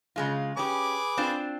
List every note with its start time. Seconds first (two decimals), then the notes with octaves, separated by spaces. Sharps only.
0.16 C#3 G#3 F4
0.57 C#4 G4 G#4 B4 D6
1.17 C4 D4 F4